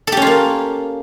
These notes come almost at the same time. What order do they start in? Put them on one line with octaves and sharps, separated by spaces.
A4 G4 C#4 F4 A#3